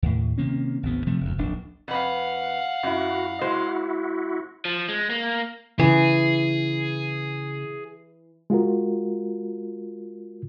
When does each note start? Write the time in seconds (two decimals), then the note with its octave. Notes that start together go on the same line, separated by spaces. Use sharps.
0.03 D#2 A2
0.38 C3 D#3 A#3 C#4
0.83 G#1 D2 B3
1.07 C3 F3 A3
1.21 F#1 D2
1.38 D1 A#1 D4
1.88 F2 B4 F5 F#5
2.83 F#2 E4 F#4
3.41 G#3 E4 F#4 C5
4.65 F3
4.88 G#3
5.10 A#3
5.79 C#3 E3 G#4
8.50 G#3 F4 F#4 A#4